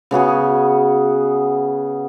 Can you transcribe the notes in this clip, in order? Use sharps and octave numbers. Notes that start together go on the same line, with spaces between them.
C#3 B3 F#4 G#4